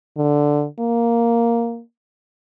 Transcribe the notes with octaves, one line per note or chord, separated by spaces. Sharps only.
D3
A#3